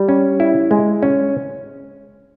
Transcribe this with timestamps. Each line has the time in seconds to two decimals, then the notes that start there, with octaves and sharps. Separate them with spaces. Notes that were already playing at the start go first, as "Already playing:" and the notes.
Already playing: G3
0.09 C#4
0.40 E4
0.71 G#3
1.03 C#4